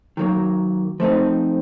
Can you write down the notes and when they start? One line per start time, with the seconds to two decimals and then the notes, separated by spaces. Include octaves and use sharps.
0.17 D#3 F#3 A#3
1.00 F3 A3 C4 D#4